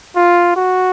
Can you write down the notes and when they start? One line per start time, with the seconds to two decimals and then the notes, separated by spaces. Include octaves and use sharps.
0.16 F4
0.57 F#4